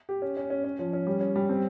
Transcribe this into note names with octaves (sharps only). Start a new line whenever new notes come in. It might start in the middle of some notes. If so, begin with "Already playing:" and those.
G4
C#4
C#4
C#4
C#4
F3
C#4
G3
C#4
G3
C4